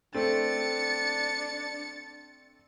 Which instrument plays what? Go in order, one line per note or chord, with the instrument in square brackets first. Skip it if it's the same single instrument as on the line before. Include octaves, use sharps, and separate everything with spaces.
[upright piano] A3 C4 [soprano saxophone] D4 [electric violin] A6 C#7